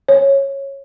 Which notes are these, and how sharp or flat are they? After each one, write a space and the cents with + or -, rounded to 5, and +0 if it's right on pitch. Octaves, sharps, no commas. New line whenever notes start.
C#5 -15